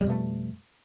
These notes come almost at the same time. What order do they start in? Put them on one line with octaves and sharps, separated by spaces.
G3 F2 B2 A3